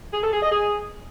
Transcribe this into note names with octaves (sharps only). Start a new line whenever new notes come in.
G#4
A4
G#4
D#5
G#4